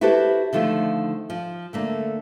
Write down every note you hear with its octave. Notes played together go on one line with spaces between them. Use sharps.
E4 F#4 G4 A4 B4 C5
D3 D#3 F3 A3 F4
F3
D3 A3 A#3